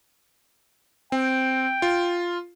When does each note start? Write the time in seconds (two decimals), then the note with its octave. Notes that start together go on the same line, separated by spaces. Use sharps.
1.12 C4 G5
1.82 F4